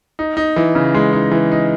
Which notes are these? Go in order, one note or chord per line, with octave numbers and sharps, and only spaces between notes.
D#4
D#4
E3
C#3
G#3
D#4
E3
D#4